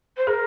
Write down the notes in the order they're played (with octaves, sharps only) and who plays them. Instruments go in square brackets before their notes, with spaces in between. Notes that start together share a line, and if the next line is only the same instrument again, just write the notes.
[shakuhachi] C5
[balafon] G#4 [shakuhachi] A#4